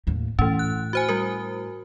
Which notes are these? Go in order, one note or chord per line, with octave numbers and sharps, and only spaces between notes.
D#2 A2
A2 E3 C#4
F#6
F#4 C5 G#5
G3 F#4 A#4